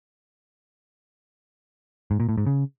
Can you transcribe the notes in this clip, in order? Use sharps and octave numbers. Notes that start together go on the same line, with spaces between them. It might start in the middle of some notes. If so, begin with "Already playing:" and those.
G#2
A#2
A2
G#2
C#3